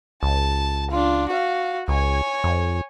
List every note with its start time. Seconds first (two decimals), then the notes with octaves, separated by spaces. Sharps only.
0.23 C#2 A5
0.91 D4 F4
1.29 F#4 F5
1.88 C#2 C#5 G#5
2.44 F2